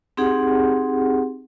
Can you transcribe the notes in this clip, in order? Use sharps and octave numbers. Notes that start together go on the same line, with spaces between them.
C4 D#4 G4 G#4 F#5